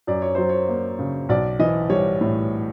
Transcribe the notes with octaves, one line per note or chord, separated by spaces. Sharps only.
F#2 D5
C#5
F#3 C5
C#5
A#3
C#3
B1 D5
E3 D#5
G3 C#5
A2